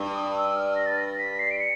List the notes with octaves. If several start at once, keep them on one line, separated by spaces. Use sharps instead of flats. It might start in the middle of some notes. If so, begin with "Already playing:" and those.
Already playing: G2
D#6
E6
F6
A#6
A6
A#6
B6
C7
D7
C#7